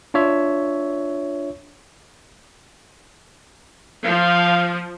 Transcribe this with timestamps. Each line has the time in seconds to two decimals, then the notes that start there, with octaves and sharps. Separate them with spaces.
0.14 D4 F4 C#5 E5
4.05 F3 F5